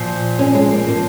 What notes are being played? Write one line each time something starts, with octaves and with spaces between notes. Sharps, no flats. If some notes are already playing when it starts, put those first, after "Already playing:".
Already playing: A#2 F3
C#4
G#3
A#3
F3 A#3